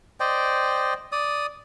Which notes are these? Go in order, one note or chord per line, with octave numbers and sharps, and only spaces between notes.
C5 D5 D#5 G5
D5 D#6